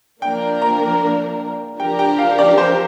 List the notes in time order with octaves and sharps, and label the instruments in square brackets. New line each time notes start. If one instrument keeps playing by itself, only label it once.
[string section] F3 A#3 D4 A#4 [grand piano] G5
[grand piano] A#5
[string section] F3 D4 G4 A#4 [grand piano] G5
[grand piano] G5
F5
D5
C5